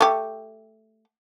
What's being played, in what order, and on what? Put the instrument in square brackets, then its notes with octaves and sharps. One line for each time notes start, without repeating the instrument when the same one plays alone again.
[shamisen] A3 G4